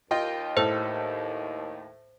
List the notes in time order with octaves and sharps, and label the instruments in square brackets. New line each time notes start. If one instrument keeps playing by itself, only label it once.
[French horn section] D#2 [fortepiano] F4 D#5 G5
[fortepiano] A2 A4 [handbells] C5